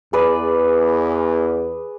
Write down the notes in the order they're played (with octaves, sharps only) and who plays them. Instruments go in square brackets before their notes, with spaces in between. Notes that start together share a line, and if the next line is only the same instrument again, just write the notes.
[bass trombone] E2 [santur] G#4 B4 D5